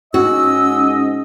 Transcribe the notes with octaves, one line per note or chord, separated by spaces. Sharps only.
G#2 C#4 F#4 D#5 E6